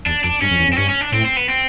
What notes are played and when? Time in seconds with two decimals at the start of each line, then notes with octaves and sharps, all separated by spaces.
0.06 E2 D4
0.24 F2 D4
0.41 G2 C#4
0.51 F2
0.59 E2
0.68 F2
0.73 C4
0.77 G2 C#4
0.89 C#4
1.01 D4
1.12 A2 C4
1.25 C4
1.36 B3
1.49 C4